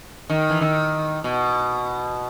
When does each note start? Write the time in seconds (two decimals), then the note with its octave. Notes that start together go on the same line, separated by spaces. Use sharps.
0.30 D#3
0.50 E3
0.61 D#3
1.24 B2